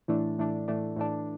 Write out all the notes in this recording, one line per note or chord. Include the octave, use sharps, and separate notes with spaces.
A2 E3 A3 D4
A2 E3 A3 D4
A2 E3 A3 D4
A2 E3 A3 D4